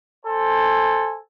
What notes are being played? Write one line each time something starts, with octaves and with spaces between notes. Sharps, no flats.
A4 C5 G#5